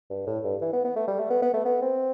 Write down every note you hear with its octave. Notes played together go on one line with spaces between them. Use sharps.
G2
A2
G2
E3
B3
B3
A3
G3
A3
B3
B3
A3
B3
C4